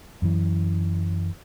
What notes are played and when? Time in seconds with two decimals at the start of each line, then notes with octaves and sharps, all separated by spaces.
0.22 F#2 E3